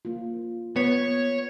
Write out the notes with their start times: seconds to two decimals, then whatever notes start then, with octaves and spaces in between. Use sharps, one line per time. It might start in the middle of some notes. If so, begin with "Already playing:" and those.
0.05 A#3 F4
0.76 B3 C#5